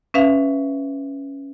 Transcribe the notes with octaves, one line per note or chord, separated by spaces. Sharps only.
C#4 B4 E5 F5